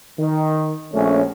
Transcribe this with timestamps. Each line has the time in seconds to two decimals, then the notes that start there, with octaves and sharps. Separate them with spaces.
0.18 D#3
0.94 A#1 A3 C#4